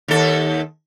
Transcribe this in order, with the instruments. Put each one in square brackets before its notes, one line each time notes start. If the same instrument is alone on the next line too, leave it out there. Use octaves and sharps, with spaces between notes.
[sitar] D#2 A4